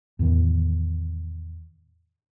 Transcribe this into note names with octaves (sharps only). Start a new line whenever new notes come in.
E2 A2 D#3 E3